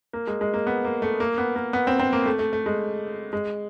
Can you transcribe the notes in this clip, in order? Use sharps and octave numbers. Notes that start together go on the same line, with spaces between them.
A#3
G#3
G#3
A#3
B3
A#3
A3
A#3
B3
A#3
B3
C4
C4
A#3
A3
A3
A3
G#3
G#3